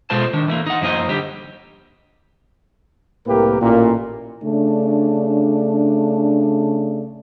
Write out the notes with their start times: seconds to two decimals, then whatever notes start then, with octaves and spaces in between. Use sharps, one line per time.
0.10 B2 G#3 F4 A4 C5 A5
0.33 D#3 D4
0.48 E3 A3 A#3
0.66 D#4 F#5
0.81 F#2 F3 A#3 D#4 C5 D#5
1.09 D3 G3 G4
3.26 C2 A2 A#3 G4 A#4 B4
3.59 A1 A#2 A#3
4.43 C#3 A3 D4